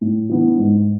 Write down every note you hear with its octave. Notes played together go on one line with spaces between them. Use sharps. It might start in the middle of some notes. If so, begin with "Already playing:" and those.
A2
E3 B3 D4
G#2